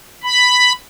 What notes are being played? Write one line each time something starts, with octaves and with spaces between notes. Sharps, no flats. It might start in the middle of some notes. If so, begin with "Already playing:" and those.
B5